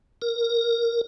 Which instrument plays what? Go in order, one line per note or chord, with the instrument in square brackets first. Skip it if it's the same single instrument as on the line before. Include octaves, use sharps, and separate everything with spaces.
[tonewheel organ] A#4